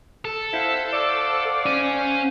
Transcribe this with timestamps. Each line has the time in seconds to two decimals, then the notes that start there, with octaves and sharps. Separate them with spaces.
0.25 A4
0.53 E4 C5 F5 F#5
0.93 D5
1.66 C#4 G#5